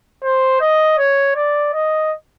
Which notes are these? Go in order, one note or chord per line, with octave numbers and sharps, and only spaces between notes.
C5
D#5
C#5
D5
D#5